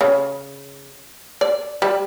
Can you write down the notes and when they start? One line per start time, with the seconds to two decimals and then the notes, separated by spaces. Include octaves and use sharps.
0.01 C#3
1.41 D5
1.82 G3